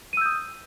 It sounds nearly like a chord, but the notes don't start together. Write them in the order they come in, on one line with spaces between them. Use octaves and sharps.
D#7 E6 G6 D#6